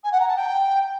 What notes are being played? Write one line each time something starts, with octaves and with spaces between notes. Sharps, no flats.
G#5
F#5
A#5
A5
G5